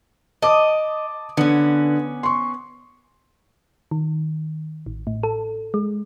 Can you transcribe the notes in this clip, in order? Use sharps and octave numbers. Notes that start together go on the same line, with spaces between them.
D#5 A5 D6 D#6
D3 B3 C#4
C6 C#6
D#3
A1
A2
A4
G#3